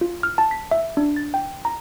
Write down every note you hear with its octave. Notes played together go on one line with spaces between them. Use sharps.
F4
F6
A5
B6
E5
D4
A6
G5
A#5